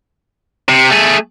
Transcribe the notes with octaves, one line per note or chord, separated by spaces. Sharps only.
C3
A3 G#4